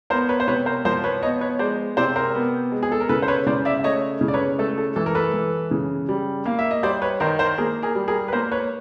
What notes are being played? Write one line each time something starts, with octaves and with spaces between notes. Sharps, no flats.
B3 A#4 C5
B4 C#5
C5
C3 B4 C#5
A#4 C5
F3 A#4 C5
B4 C#5
B3 C#5 D#5
B4 C#5
G#3 C5 D5
C3 C5 D5
A#4 C5
B3
G#3
G#4
A4
A#4
C#3 A4 B4
C5
B4 C#5
C#3 C5 D5
D5 E5
E5
A3 C#5 D#5
C#3
D5
B4 C#5
A3 A4
A4
E3 A4
A#4
A4 B4
E3
C#3
G3
A#3 F5
E5
D#5
G3 C5 D5
B4 C#5
D#3 A#4 C5
A#4 C5
A#3 G#4 A#4
G#4 A#4
G3
G#4 A#4
B4
A#3 A#4 C5
B4 C#5